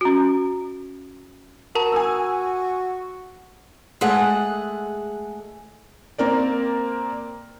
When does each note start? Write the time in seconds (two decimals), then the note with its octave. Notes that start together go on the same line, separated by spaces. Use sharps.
0.01 C#4 F#4
1.75 F#4 A#4 A5 A#5
1.92 G#5 D#6 E6
4.01 G#3 A3 G#4 F#5
6.18 A#3 C4 A#4 D5